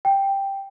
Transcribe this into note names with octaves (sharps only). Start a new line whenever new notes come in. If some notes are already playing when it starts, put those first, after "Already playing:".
G5